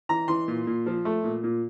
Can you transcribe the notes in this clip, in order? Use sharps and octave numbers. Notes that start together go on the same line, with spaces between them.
E3 A#5
E3 C6
A#2
A#2
F3
A3
A#2
A#2